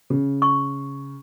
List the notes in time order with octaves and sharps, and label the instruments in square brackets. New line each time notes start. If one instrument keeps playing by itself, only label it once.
[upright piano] C#3
[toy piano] C#6